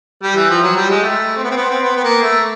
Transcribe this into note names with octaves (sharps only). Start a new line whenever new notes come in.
G3
E3
F3
F#3
G3
G#3
A3
C4
B3
C4
B3
C4
B3
B3
A#3
A3